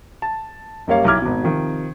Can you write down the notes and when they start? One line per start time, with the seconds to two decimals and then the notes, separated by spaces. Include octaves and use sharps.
0.22 A5
0.87 F#2 G3 A#3 C#5 F5
1.05 B1 E4 D6 F6 G#6
1.22 G#1 B2
1.44 C3 D#3 F3